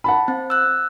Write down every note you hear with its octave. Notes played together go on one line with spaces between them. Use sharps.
F#5 A5 B5
C4
E6 F#6